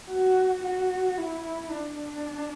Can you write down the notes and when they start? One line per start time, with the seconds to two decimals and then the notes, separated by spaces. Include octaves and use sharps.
0.10 F#4
0.63 F#4
1.17 E4
1.70 D4